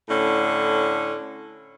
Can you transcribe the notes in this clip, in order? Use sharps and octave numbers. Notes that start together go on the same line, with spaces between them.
A2 D3 C#4